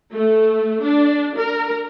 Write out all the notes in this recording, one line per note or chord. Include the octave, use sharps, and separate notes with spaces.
A3
D4
A#4